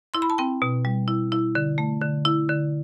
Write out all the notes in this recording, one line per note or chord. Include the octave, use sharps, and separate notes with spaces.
E4 C6
B5
A5
C4 G5
B2
G3
E4
E4
D3
A3
D3
E4
D3